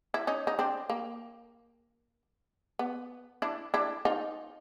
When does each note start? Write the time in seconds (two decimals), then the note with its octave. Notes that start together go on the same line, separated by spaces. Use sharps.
0.14 E4
0.27 C#4 D#4
0.47 D#4
0.59 C4 D4
0.90 A#3
2.79 B3
3.42 D4 E4
3.74 D4 E4
4.05 D#4 F4